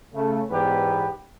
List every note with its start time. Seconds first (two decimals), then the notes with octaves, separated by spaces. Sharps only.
0.14 C#3 A3
0.51 E2 G#2 B3 G4 B4